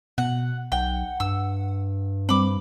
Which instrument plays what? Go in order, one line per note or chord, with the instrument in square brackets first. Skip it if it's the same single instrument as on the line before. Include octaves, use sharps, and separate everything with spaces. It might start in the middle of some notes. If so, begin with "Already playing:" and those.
[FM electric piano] B2 [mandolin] F#5
[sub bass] B1 [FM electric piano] F#5 [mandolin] G5
[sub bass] G2 [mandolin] E6
[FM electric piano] G3 C4 [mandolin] B5 D6